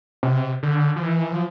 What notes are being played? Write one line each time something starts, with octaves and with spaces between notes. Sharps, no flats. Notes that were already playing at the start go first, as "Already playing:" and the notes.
C3
D3
F3
E3
F3